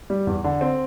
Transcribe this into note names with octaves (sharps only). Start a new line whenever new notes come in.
G3
E2
D3
C4